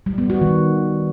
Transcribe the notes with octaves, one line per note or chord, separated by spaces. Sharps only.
G3
B3
F#4
D#3